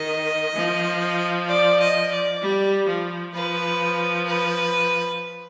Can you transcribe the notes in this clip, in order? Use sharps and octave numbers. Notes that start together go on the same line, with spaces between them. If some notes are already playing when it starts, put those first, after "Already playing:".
Already playing: D#3 D#5
F3
D5
D#5
D5
G3
F3
F3 B4
B4